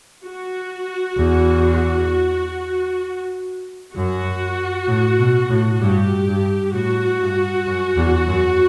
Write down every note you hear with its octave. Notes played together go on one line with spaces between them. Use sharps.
F#4
E2
F#2 F#4
A2
B2
A2
G2 G4
G2
A2 F#4
G2
F#2
E2
F#2